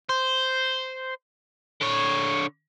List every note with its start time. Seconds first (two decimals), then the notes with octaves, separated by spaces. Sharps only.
0.09 C5
1.81 D3 C#5